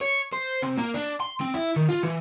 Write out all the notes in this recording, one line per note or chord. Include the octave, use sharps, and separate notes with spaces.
C#5
C5
C3
A#3
D4
C6
C4
E4
D#3
F4
E3